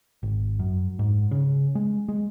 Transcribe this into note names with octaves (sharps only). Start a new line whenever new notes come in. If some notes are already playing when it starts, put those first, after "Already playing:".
G#1
F#2
G#2
C#3
G#3
G#3